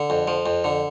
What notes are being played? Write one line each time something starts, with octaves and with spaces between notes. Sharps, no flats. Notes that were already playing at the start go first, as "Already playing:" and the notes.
Already playing: D3
F2
F3
F2
D3